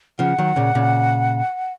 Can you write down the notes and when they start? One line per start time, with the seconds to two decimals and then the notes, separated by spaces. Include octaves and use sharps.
0.19 C#3 F3 F#5
0.38 D#3 F#3
0.56 A#2 C#3
0.75 A#2 C#3